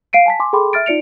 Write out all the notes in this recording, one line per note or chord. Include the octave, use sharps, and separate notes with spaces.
F5 C7 D7 D#7
G#5 A5 B6
G#5 C6 D6
G#4 A4 G5 B5 C6 D6
E5 F6 A6 D7
D#4 F4 D5 C#7 D7 F7